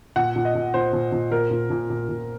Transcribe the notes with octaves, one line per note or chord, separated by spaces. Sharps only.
A#2 F#5
A#2
D#5
A#2
A#2 C5
A#2
A#2
A#2 A#4
A#2
A#2
A#2
A#2